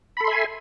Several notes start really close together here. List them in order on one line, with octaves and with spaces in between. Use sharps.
B5 A4 C6 E5 G#5